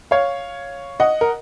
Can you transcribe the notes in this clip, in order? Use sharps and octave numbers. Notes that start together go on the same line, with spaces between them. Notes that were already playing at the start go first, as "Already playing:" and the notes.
C#5 F5
D#5 F#5
A#4